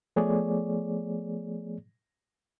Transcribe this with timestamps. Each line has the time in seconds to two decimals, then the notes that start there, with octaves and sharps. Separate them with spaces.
0.16 F3 A3 B3 G#4 C#5 D5